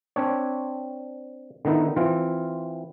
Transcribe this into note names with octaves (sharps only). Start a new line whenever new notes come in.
C4 D4 C#5
D3 D#3 B3 D#4 E4
E3 C4 F4